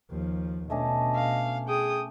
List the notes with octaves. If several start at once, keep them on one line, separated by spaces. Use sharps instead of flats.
D#2 F3
B2 A3 C#4 D4 D#5
F5
G#4 G5 D#6